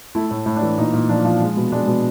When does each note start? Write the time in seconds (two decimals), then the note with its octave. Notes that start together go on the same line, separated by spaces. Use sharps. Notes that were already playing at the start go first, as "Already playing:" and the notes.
0.15 A3 E4
0.31 A2
0.46 A2
0.56 D4
0.62 E3
0.78 A#2 D#4
0.93 A#2
1.09 F3 D4
1.25 F3
1.41 G#3
1.57 B2
1.72 G#3 D4
1.87 B2